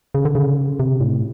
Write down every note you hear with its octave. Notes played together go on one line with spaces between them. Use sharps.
C#3
D3
C#3
C3
A2